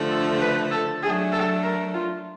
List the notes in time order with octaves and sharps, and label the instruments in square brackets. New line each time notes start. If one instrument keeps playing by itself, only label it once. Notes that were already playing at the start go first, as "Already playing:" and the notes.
Already playing: [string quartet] D3 F3 A3
[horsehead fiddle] A4
B4
A4
[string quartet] F#3 A3 D4 [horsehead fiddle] G#4
[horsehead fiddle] A4
A#4
F4